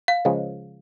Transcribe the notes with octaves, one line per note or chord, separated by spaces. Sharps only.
F5
C#2 C#3 F3 G#3